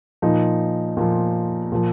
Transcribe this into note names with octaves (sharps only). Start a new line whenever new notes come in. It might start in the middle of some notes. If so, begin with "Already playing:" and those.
A#2 F3 D#4
A#2 F3
A#2 F3